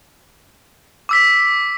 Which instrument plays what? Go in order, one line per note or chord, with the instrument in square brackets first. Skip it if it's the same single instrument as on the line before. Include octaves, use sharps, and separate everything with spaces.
[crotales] D6 E6 B6